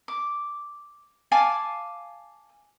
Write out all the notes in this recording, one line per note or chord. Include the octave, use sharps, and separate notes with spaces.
D6
F5 G#5 A5 D6